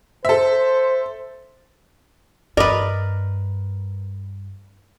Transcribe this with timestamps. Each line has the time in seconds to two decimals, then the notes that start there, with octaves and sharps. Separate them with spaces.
0.25 A4 C5 E5
2.57 G2 A#4 B4 D5 D#5